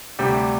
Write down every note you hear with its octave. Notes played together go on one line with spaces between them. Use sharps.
D2 C3 G3 D4 G4